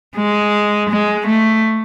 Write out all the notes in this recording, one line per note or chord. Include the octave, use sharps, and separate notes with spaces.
G#3
G#3
A3